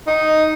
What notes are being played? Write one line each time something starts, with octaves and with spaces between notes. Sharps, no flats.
D#4